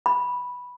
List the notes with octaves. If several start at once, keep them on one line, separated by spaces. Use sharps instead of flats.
B5